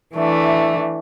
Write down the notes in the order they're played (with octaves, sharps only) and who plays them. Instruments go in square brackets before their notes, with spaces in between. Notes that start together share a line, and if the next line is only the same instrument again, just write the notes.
[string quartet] E3 A3 D4